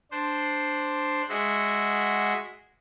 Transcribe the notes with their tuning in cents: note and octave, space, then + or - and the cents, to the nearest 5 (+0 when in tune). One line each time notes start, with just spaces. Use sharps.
D4 +0 C5 +0
G#3 -5 F#4 -5 E5 +0